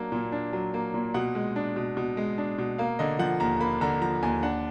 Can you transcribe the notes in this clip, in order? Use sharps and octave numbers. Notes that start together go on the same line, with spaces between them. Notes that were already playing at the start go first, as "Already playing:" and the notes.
Already playing: F#3 A#3 D4
A#2
D4
F#3
A#3
A#2
B2 F#5
G#3
D4
B2
B2
G#3
D4
B2
A#3 F5
D3 D#5
F3 F#5
D#2 A#5
A#3 B5
D3 A#5
F3 A#5
D#2 G#5
D4 F#5